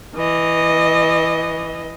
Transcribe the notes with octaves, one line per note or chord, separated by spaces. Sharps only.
E3 D#5